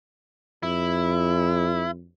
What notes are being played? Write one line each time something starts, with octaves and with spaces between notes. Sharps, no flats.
F2 E4